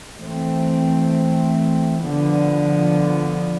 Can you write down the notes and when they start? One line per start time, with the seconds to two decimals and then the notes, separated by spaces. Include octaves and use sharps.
0.17 E3 A3 C4
2.02 D3 F3 B3